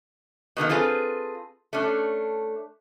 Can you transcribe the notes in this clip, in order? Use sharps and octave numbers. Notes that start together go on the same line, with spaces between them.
B2 D3 D#3 A#3
C4 F4 G#4 A4 B4
A3 C#4 D4